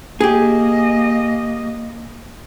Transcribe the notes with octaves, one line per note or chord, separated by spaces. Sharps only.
A#3 G4 G#4 D#5